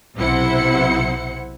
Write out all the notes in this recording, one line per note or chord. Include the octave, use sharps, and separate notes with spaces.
B1 C3 E4 C5 F#5 C#7